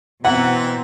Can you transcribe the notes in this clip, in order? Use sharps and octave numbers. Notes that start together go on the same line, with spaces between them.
B2 E3 C4 F#5 A#5